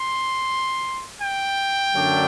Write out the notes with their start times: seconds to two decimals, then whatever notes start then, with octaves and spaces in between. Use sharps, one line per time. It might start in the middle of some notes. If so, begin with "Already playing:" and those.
Already playing: C6
1.20 G5
1.93 F#2 D3 F#3 A3 D4